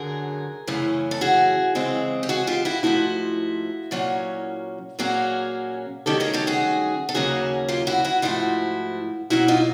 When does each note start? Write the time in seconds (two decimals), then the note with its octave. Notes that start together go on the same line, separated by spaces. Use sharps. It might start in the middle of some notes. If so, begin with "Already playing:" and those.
Already playing: F#2 D3 F#3 G#4 A#4
0.67 F#2 C#3 E3 A3 C#4
1.11 A4
1.21 F#4 G#4
1.75 C#3 E3 G#3 C4
2.23 G4
2.29 F#4 G#4
2.47 F4 G4
2.65 E4 F#4
2.83 G#2 F3 A3 E4 F#4
3.91 A#2 F#3 A#3 C#4
4.99 A#2 F#3 A#3 C#4 F#4 G#4
6.06 G2 D#3 F#3 A3 C#4 G4 A4
6.20 G#4 A#4
6.33 G4 A4
6.47 F#4 G#4
7.09 A4
7.14 D#2 C#3 F#3 A#3 C#4 F#4 G#4
7.68 F4 G4
7.87 E4 F#4
8.05 E4 F#4
8.22 G#2 F3 A3 E4 F#4
9.30 B2 F#3 A#3 C#4 E4 F#4
9.48 D#4 F4